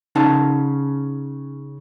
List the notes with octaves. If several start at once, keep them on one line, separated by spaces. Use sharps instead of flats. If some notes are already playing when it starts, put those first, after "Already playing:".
C#3 D#4 A5